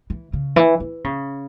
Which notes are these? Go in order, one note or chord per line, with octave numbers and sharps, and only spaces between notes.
E3
C#3
E3
E3
C#3